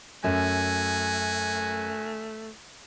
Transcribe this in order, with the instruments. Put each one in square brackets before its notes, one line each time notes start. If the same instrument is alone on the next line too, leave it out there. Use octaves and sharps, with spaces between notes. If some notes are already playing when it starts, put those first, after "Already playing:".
[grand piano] F#2 [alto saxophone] A3 [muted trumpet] F#4 [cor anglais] G#5